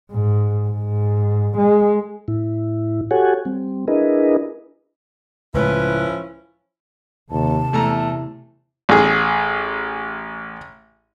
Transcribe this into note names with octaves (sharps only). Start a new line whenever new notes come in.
G#2
G#2
G#3
A2 E4
F#4 G4 A4 C#5 F#5 G#5
G3 C4
D4 E4 G#4 A#4 B4 D#5
C#2 A2 F3 C#4 E4 B4
D#2 C3 A5
E2 A3 E4 A#5
A1 G#4